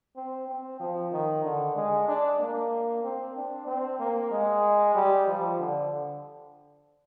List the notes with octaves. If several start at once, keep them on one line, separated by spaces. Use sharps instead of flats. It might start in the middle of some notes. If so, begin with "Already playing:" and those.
C4
C4
F3
D#3
D3
G#3
D4
A#3
C4
D4
C4
A#3
G#3
G3
F3
D3